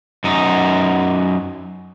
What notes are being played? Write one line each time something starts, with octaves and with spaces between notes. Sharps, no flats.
F#2 D#4